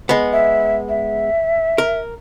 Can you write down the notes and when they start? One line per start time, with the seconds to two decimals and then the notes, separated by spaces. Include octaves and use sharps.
0.09 G#3 B3
0.32 E5
0.89 E5
1.78 A#4